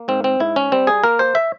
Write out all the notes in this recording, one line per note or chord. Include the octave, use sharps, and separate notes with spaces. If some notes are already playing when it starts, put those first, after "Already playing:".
Already playing: A#3
G#2 C4
C4
G#2 E4
C#4
G3 C4
G#4
A#3 A#4
C5
E5